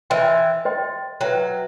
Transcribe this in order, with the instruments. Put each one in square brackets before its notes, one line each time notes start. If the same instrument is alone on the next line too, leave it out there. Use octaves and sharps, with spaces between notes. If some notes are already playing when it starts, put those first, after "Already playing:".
[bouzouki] E3 [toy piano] C5 D#5 G5 C6
[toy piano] C5 D#5 G5 C6
[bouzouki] F#3 [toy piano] B4 E5 G5